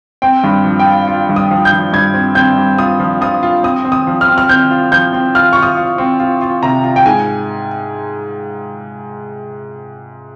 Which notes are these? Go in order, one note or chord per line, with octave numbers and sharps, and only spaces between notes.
C4 G5
G2
F3
G5
F4
F4
G2
D#6
F3
G6
F3
G2 G#6
C4
C4 G6
G2
F4 D#6
F3
F4 D#6
F4
C4 D#6
C4
D#6
F3
F6
C4
F6
C4 G6
F4
F3 G6
C4
F4 F6
F4 C#6
D#6
F4
C4
F4
F4
C3 A#5
F4
G5
G#2 G#5